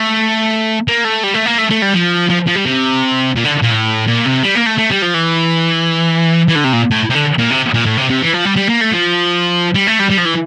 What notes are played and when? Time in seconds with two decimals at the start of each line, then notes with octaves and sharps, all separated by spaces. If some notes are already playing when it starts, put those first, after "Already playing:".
Already playing: A3
0.88 A#3
1.05 A3
1.23 G3
1.34 A3
1.46 A#3
1.58 A3
1.70 A3
1.82 G3
1.94 F3
2.29 F3
2.47 F3
2.56 G3
2.66 C3
3.36 A#2
3.45 D3
3.63 A#2
3.71 A2
4.08 A#2
4.26 C3
4.43 G3
4.55 A#3
4.66 A3
4.78 A3
4.90 G3
5.02 F3
5.14 E3
6.48 E3
6.55 D3
6.64 C3
6.73 A#2
6.91 A2
7.10 C3
7.15 D3
7.38 A#2
7.51 C3
7.74 A#2
7.86 A2
7.97 C3
8.10 C3
8.22 E3
8.34 F3
8.45 G3
8.57 G3
8.69 A#3
8.81 A3
8.93 F3
9.75 G3
9.88 A3
10.00 G3
10.11 G3
10.18 F3
10.26 E3